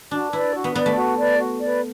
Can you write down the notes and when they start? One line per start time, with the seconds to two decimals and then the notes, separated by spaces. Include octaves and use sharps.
0.11 D4 F#4
0.32 E4 B4 D5
0.54 F#4
0.64 B3
0.75 B3 B4 D5
0.86 A3
0.96 F#4
1.18 B4 D5
1.38 F#4
1.60 B4 D5